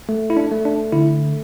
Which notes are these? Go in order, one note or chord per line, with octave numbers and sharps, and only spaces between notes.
A3
E4
D4
A3
D4
D3 E4